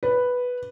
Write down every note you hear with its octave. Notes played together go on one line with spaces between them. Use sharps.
B4